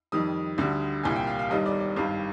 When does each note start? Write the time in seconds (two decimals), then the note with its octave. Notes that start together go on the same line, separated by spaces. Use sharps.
0.12 F2 D#3 G3 D#6
0.58 D2 D3 G3
1.03 C2 A#2 G3 G#5
1.16 G5
1.27 F5
1.39 F5
1.50 G1 G2 D#3 G3 D#5
1.66 D5
1.81 D5
1.96 G#1 G2 D#3 G3 F5